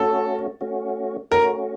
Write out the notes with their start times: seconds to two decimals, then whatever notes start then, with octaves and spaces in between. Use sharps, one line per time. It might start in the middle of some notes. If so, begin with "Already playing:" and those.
Already playing: A3 C#4 F#4 A4
0.61 A3 C#4 F#4
1.31 A3 C#4 F#4 A#4